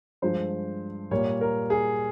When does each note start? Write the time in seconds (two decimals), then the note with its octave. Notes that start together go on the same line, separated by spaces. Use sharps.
0.22 G2 F3 G#3 C5
1.11 A#2 G3 A#3 C#5
1.41 A#4
1.70 G#4